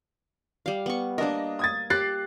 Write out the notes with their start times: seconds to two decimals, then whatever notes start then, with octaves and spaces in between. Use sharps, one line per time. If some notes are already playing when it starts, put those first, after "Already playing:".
0.66 G3 F5
0.86 B3 C#6
1.18 A#3 D4 A#4 D#5
1.59 D#6 G#6 A6
1.90 G4 F#6 A6 C7